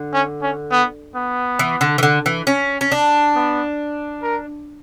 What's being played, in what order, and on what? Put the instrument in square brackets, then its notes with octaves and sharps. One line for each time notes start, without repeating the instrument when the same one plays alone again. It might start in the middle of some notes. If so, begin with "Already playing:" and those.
Already playing: [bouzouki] D3
[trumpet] C#4
C#4
B3
B3
[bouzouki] E3
D3
E3
D3
E3
C#4
C#4
D4
[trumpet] B3
A#4